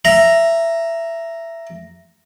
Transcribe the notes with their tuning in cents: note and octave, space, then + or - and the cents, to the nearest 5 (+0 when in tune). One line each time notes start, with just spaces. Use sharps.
E5 +15 A#5 +0